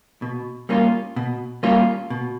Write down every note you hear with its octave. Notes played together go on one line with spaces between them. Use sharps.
B2
G3 A#3 C#4 F4
B2
G3 A#3 C#4 F4
B2